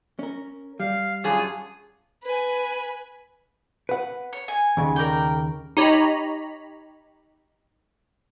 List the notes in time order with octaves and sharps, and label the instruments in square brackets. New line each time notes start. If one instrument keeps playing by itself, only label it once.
[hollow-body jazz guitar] C#4 A#4
[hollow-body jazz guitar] G3 [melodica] F5
[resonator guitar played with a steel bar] F#2 G#4 [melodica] D4 F4 C#5
[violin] B4 G#5
[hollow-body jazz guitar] B4 F#5
[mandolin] C#5
G#5
[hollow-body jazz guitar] D#2 C#3
[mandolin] A#4 D5 G5
[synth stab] D#4 G4 C#5 A#5 B5